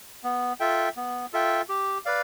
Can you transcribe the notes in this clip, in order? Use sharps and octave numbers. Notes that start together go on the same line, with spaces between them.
B3
F4 A4 E5 G5
B3
F4 A4 E5 G5
G4
B4 D5 F5